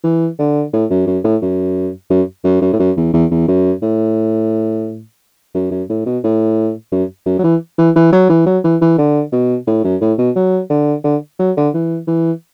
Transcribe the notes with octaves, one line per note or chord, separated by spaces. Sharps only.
E3
D3
A2
F#2
F#2
A2
F#2
F#2
F#2
F#2
A2
F#2
E2
E2
E2
F#2
A2
F#2
F#2
A2
B2
A2
F#2
F#2
F#3
E3
E3
E3
F#3
E3
F#3
E3
E3
D3
B2
A2
F#2
A2
B2
F#3
D3
D3
F#3
D3
E3
E3